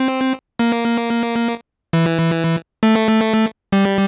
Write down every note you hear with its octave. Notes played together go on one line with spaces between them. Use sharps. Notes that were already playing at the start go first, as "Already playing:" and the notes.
Already playing: C4
A#3
E3
A3
G3